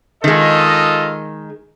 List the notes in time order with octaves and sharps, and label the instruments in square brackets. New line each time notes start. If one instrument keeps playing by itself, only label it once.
[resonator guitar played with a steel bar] D#3 G#3 [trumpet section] F4 A4 D#5